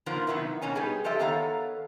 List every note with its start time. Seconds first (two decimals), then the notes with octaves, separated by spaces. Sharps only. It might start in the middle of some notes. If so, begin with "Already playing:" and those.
0.06 A#2 D#3 F3 A#3 B3
0.27 C3 D#3 F#3 B3 D#4 E4
0.61 B2 A#3 C#4 G#5
0.75 G3 B3 D#4 G4 G#4 B4
1.04 F3 G4 A4 D#5 E5
1.19 D#3 B3 A4 C#5 F5 A#5